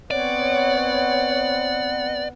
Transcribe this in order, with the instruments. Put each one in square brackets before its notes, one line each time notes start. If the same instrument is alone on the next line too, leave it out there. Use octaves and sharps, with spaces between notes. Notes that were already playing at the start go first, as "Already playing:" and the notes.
[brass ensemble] B3 C4 F#5 [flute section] C#5 [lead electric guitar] D5